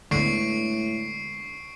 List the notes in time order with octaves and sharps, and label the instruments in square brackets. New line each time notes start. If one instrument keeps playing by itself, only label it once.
[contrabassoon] A2 [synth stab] D3 [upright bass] G#3 B3 [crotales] C#6 C7 D7